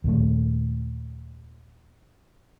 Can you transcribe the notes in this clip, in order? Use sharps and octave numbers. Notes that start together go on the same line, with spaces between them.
D#2 A#2 A3